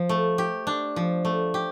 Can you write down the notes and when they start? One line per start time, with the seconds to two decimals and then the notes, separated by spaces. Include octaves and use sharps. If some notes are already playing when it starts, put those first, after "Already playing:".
Already playing: F3
0.09 A3
0.38 G4
0.67 D4
0.96 F3
1.25 A3
1.54 G4